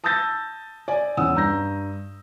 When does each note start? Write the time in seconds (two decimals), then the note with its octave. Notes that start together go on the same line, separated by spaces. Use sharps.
0.04 A5 D#6 E6 G6 A6 A#6
0.88 D5 G#5
1.17 E2 C#4 F#5 D#6 E6
1.35 G2 A#5 G6 A#6